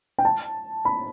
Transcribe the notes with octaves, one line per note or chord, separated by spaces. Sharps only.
G5
A5
B5